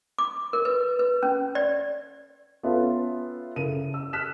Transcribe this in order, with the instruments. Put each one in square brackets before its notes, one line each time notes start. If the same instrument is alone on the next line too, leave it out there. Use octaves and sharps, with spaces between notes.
[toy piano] D6
A#4
B4
B4
C#4
D5
[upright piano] B3 C#4 F4 A4 E5
C#3 E4 A4 A#4 D#7
E6
F6 F#6 B6 E7